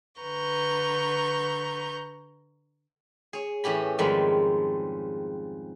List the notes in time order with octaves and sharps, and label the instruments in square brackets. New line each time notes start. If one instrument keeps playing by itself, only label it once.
[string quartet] D3 B4 A#5 C#6 G6
[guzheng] G#4 C#5
A2 E3 C#4 G4 B5
F2 G#2 D#3 G3 G#3 B5